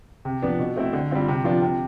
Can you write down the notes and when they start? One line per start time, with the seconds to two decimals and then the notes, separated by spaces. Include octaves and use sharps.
0.25 C3
0.42 F3 B3 D4
0.59 B2
0.76 A3 C4 E4
0.93 D3
1.11 G3 C4 F4
1.28 C3
1.44 F3 B3 D4 F4
1.62 C3